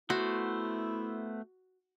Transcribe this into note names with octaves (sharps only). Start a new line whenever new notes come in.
A3 B3 E4 F#4 C5